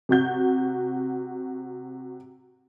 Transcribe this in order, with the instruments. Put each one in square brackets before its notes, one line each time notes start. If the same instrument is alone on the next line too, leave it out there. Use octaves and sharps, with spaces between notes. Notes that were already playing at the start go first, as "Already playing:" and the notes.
[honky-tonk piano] C3 F#4 G6